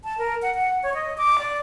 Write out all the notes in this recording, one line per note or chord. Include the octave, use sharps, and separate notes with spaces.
A5
A#4
F#5
F#5
C#5
D#5
D6
D5